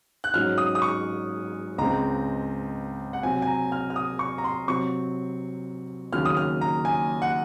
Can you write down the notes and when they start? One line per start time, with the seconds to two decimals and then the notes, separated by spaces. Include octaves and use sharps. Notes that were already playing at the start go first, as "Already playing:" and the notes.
0.24 F#6
0.34 G#2 F#3 C#4 F6
0.58 D#6
0.75 D#6
0.82 C#6
1.78 C#2 C#3 G#3 C4 A#5
3.13 F#5
3.23 C3 F#3 C4 G#5
3.42 G#5
3.47 A#5
3.72 F6
3.90 F6
3.96 D#6
4.19 C#6
4.38 A#5
4.44 C6
4.67 C3 F#3 C4 C#6
6.12 D#2 C#3 F#3 F6
6.25 D#6
6.37 F6
6.61 A#5
6.85 G#5
7.22 F#5